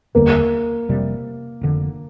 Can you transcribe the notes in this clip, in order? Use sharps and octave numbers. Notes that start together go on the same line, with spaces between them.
F1 D#2 D3 G3 A#3
F1 F2 C3 G3
F1 F2 D3